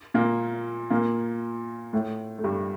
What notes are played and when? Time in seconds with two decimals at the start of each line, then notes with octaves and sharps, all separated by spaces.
0.14 A#2 A#3
0.90 A#2 A#3
1.93 A2 A3
2.38 A3
2.44 G2 G3